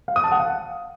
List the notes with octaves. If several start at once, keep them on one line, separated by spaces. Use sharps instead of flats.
F5
D#6
A5
F#5
F5